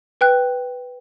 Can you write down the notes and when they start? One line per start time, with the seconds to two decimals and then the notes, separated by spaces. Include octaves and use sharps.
0.21 B4 G5 F#6